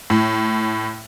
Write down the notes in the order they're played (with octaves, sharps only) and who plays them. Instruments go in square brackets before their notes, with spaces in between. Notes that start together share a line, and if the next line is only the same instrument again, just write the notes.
[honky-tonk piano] A2